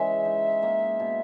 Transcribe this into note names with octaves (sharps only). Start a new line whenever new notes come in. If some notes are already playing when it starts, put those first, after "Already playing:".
Already playing: C#3 E3 G#3 E5
D#4
A#3
B2